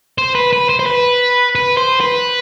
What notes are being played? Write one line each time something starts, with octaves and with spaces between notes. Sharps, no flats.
C5
B4
B4
C5
C5
B4
B4
C5
B4